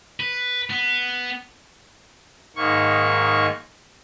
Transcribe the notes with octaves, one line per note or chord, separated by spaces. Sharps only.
B4
B3
G#2 D#3 A#3 C#6